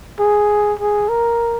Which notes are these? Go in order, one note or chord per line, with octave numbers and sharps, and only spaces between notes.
G#4
G#4
A#4